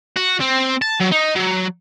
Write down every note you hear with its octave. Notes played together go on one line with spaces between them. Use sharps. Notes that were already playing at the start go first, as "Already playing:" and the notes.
F#4
C4
A5
F#3
D#4
F#3